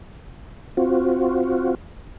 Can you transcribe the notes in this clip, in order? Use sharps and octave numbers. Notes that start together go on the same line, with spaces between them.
C4 F4 F#4